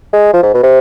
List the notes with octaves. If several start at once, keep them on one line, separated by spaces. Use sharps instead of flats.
G#3
F3
G#2
B2
C3